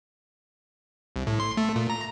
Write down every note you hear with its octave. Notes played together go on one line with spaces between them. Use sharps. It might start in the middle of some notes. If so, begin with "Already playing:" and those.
C2
A2
C6
A3
A#2
A#5